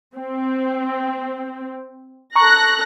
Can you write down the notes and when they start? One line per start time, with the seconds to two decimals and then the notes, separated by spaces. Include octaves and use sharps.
0.17 C4
2.36 A4 A#5 C#6 F#6 A#6